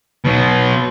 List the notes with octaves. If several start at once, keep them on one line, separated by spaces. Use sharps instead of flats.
B2 F#3